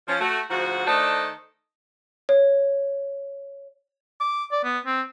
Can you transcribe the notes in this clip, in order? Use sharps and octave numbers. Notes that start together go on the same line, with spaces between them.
F3 C#4
A3 F#4
D2 G#2 F3 F#4
D#3 A3 D4 A4 C5 D#5
C#5
D6
D5
B3
C4